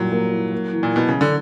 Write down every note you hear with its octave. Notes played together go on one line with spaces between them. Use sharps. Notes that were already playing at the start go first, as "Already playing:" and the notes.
Already playing: A#2 F#3 G3 E4
A#3
E4
A#3
E3
A#2
B2 E4
C#3 E3
D3